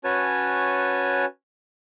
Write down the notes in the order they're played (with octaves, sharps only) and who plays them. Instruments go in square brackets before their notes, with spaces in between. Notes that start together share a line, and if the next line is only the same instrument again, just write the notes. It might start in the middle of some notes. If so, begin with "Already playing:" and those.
[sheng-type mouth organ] C#4 F#4 B4 C#5 G#5 A5